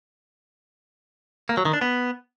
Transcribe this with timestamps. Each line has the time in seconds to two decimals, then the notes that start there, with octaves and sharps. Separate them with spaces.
1.49 A#3
1.57 F#3
1.65 D#3
1.73 D4
1.81 B3